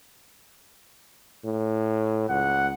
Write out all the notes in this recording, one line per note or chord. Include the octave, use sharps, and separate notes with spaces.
A2
C#2 F#5